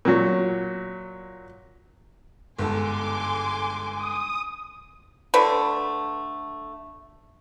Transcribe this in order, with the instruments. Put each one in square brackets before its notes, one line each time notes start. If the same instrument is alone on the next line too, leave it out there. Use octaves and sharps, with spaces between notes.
[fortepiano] A#2 F#3
[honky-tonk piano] G1 G#2 A4 [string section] G#5 C6 D6
[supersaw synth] D#6
[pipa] D3 A3 B4